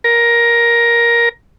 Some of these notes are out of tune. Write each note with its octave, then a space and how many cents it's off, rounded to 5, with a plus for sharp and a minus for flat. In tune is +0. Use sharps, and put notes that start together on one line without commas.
A#4 +10